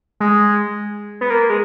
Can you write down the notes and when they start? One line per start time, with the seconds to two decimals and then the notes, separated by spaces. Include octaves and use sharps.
0.20 G#3
1.21 B3
1.30 A#3
1.49 G#3